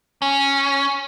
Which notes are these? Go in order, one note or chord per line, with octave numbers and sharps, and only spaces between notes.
C#4